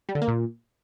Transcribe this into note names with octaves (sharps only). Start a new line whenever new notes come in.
G3
D3
A#3
A#2